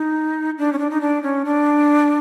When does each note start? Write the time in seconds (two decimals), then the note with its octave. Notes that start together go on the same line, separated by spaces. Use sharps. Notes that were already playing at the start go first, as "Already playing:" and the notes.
Already playing: D#4
0.58 D4
0.73 C#4
0.79 D4
0.90 D#4
1.01 D4
1.23 C#4
1.45 D4